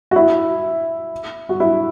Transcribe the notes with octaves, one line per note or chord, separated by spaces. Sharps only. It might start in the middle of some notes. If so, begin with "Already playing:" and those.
F#4
E4
F#4
E4